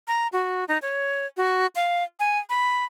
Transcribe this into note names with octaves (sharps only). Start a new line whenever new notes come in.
A#5
F#4
D#4
C#5
F#4
F5
G#5
B5